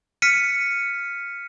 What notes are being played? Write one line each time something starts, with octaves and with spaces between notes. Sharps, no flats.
F6 B6 C#7 D#7